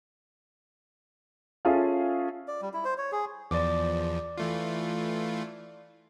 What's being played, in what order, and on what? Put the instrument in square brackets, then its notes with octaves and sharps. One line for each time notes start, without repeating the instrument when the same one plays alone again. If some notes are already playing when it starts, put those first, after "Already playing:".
[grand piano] C#4 F4 G#4 A4 E5 F5
[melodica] D5
G3
E4
C5
C#5
G#4
[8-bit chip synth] E2 F3 [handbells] D5 D6
[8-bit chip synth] E3 A3 F4